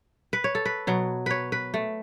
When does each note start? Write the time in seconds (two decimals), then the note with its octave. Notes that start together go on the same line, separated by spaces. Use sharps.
0.33 B4
0.44 C#5
0.55 A4
0.65 B4
0.87 B2 F#3
1.26 B4 C#5
1.52 B4
1.74 A3